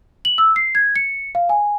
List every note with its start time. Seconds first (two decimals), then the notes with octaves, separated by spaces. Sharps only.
0.25 F#7
0.38 E6
0.56 C7
0.75 G#6
0.96 C#7
1.35 F5
1.49 G#5